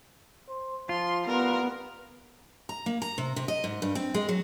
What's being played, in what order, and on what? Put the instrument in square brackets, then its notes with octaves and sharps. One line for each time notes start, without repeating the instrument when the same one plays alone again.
[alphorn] C5
[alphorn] F3 [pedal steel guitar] F4 [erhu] C6
[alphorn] G3 [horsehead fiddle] B3 [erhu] A#4
[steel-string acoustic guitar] A#5
A#3
A#5
C3
C3
D#5
G#2
G2
C4
G#3
F#3